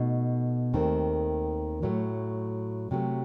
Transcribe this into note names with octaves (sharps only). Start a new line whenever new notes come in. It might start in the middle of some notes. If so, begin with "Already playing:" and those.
Already playing: B2 A3 D#4
D#2 D#3 A3 C4
A2 F#3 A3
C3 F#3 A3